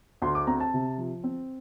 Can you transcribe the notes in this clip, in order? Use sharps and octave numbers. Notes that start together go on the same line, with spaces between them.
D2 C6
D6
C4 A#5
A5
C3
F3
C4